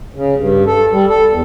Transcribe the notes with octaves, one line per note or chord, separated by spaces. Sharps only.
C#3
G2
A4
G3
A4
E2